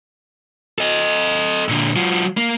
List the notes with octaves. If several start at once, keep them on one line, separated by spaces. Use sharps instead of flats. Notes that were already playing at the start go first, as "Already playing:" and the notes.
A4 D#5
A#2 D3
F#3 F4
A#3